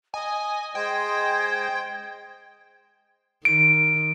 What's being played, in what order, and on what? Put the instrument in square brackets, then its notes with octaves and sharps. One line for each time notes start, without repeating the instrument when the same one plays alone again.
[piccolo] D#5 [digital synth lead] G#5
[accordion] G#3 C5 D#5 [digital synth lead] G5 [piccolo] G#6
[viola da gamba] D#3 [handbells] D7